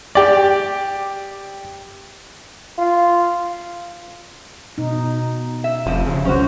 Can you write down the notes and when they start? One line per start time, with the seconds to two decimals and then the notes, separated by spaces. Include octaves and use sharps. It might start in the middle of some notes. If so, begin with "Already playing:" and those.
0.15 G4 D5
2.79 F4
4.78 B2 D#4
5.64 E5
5.86 F1 F3 C4
6.06 C#3
6.25 C#2 F#3 C#4 F#4 C5